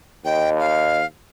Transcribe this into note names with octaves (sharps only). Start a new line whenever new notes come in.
D#2 D#5 G5
F5